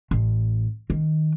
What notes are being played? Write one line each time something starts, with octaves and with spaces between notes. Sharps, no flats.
A1
D#3